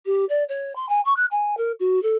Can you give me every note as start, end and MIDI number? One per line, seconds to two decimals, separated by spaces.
0.06 0.25 67
0.29 0.44 74
0.49 0.75 73
0.76 0.86 84
0.89 1.01 80
1.05 1.16 85
1.16 1.26 90
1.31 1.55 80
1.57 1.72 70
1.80 2.02 66
2.03 2.17 69